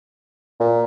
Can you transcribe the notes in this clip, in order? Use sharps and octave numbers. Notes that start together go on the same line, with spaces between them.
A#2